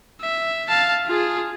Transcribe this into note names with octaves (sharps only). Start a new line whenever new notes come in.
E5
F5 A5
F4 G#4